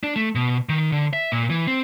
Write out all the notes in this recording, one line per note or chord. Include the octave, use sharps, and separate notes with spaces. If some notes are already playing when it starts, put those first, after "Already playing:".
D4
A3
B2
D#3
D3
E5
A#2
E3
C4